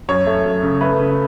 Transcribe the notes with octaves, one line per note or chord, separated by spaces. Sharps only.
F#2 C#5
A3
F#2
C#3
A3 B4
C#3